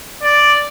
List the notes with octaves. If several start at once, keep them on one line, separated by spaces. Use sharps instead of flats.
D5